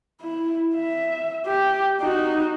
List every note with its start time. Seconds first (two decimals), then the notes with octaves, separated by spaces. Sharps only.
0.21 E4
0.75 E5
1.46 G4
2.01 D#4 F#4